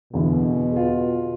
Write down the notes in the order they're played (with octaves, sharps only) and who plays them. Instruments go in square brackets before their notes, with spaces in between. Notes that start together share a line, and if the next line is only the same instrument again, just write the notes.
[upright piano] E2 D3 E3 [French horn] B2
[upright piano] F4 G#4